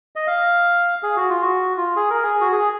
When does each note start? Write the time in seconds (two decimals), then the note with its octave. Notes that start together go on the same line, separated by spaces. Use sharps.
0.16 D#5
0.27 F5
1.03 G#4
1.16 F#4
1.29 F4
1.42 F#4
1.77 F4
1.96 G#4
2.10 A#4
2.23 G#4
2.41 F#4
2.52 G#4